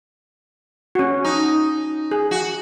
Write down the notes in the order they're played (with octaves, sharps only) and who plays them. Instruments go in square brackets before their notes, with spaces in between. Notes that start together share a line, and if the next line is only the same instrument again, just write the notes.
[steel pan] C#4 F#4
[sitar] D#4
[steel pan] G#4
[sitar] F#4